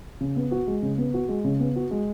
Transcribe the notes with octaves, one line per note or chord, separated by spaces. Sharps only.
C#3
B3
F#4
G#3
C#3
B3
F#4
G#3
C#3
B3
F#4
G#3